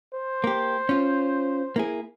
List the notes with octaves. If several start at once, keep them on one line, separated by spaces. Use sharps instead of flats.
C5
A#3 G4
C#4 F4
A#3 E4 G#4